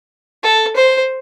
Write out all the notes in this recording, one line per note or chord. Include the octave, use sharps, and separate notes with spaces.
A4
C5